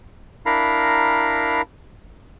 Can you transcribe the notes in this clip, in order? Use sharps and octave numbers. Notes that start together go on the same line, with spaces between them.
D4 E4 A#4 F5 A#5 B5